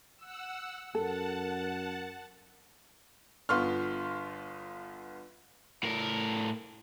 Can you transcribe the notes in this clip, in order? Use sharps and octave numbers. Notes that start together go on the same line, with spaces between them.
F#5 E6
F#2 A4 A#4 F#5 A5
G1 B3 F4 C6 C#6 F6
A2 A#4